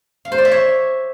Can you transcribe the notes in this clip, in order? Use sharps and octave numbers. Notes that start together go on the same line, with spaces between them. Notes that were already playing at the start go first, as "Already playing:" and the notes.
F5
C5
D5
E5
C#5